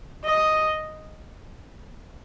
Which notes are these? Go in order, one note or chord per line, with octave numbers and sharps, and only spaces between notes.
D#5